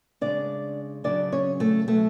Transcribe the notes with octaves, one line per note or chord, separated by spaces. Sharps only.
C#3 G#3 D4 D5
C#3 F#3 D4 D5
C#4 C#5
A3 A4
B2 F#3 A3 A4